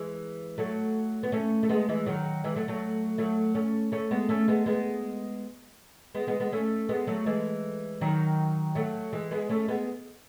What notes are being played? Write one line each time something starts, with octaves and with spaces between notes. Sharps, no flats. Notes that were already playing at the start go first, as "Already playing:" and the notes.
Already playing: E3 G#3
F#3 A3
B3
A3 C#4
A3
G#3 B3
E3 G#3
D#3 F#3
E3 G#3
F#3 A3
F#3 A3
F#3 A3
A3 C#4
A3 C#4
G#3 B3
A3 C#4
G#3 B3
G#3 B3
G#3 B3
G#3 B3
G#3 B3
A3 C#4
G#3 B3
F#3 A3
E3 G#3
D#3 F#3
F#3 A3
E3 G#3
G#3 B3
A3 C#4
G#3 B3